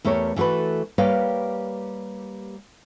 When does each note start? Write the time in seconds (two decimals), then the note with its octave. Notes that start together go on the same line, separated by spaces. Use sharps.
0.05 E2 A3 G4 A#4 C#5
0.36 E3 A3 F#4 A4 B4
0.98 G3 A#3 G4 B4 C#5 F5